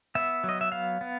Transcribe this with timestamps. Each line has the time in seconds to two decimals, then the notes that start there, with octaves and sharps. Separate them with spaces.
0.15 B3 E5
0.44 F#3
0.49 D#5
0.61 E5
0.72 B3 F5
1.01 B3